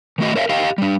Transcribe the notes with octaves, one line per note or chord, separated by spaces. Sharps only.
D#3 A3 F#4 D#5
A#4 C#5 E5 F5
G4 D#5 F5 G5
G3 D4